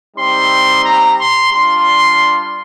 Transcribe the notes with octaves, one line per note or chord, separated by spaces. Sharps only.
G3 C4 D#4 G4 C6
A#5
C6
G3 D4 F4 C6